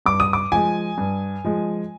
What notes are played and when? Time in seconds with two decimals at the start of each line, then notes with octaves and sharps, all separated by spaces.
0.06 G2 D6
0.20 D#6
0.33 D6
0.52 F3 G#3 G#5
0.98 G2
1.44 F3 G#3